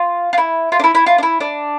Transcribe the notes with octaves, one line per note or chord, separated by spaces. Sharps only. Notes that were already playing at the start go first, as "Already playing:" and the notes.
Already playing: F4
F4
E4
F4
D4
E4
E4
F4
D4
E4
D4